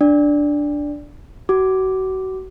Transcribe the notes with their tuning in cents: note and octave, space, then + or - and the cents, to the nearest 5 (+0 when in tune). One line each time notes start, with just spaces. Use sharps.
D4 +0 D5 +0
F#4 +30 D6 +0